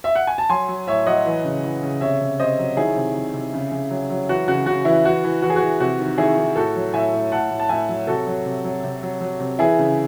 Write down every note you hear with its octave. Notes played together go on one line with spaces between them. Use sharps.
E5
F#5
G#5
A5
F#3 G#5 C6
F#3
A2 C#5 E5
F#3 D#5 F#5
E3
C#3
E3
C#3
C3 C#5 E5
C3
C3 C5 D#5
F#3
D#3 E4 G#4
C3
C3
C3
C#3
C#3
F#3
F#3
E3 F#4
C#3 F#4
C#3 F#4
E3 E4
E3 F#4
E3
E3 F#4
G#4
F#4
E3
C3 F#4
D#3
D#3 E4 G#4
D#3
A2 F#4 A4
F#3
A2 E5 G#5
A2
A2 F#5 A5
A2
A5
A2 E5 G#5
F#3
C3 F#4 A4
F#3
C3
F#3
C3
F#3
F#3
C3
E3 E4 G#4
C#3